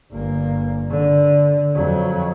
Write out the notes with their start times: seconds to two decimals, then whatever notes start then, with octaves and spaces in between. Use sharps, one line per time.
0.12 G1 A#3
0.90 D3
1.75 F2 F#3